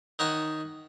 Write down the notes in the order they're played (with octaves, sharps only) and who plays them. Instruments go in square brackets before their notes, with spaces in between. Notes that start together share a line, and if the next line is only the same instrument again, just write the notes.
[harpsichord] D#3 D#4 C#5 F#5 C6